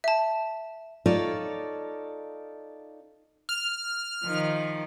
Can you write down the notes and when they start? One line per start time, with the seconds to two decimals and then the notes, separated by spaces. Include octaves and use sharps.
0.04 E5 A5
1.06 D#4 F4 A4 C#5 D5
3.49 F6
4.24 D#3 F3